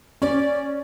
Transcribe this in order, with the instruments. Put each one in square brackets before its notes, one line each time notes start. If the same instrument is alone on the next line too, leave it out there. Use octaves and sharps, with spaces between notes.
[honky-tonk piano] C#4 [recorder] D5